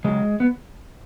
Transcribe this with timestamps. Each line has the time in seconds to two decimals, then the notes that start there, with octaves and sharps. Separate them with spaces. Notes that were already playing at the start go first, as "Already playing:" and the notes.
0.04 C#3 F#3 G#3
0.40 B3